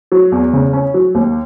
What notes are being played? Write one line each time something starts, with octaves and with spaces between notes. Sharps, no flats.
F#3
E2
C#3
C#4
F#3
D#2